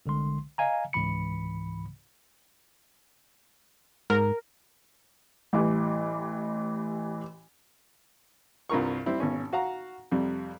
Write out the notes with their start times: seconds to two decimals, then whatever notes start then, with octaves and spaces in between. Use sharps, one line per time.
0.06 C2 D3 G#3 C6
0.58 D#5 F5 G#5 A#5
0.93 C#2 G#2 E3 B5 C#7
4.10 G#2 A#4
5.53 A1 E3 G3
8.70 C2 G2 F4 A#4 C#6
9.06 G3 C4 E4
9.20 G#1 B2 C#4
9.53 F#4 F5 F#5 A#5
10.12 F2 C3 G3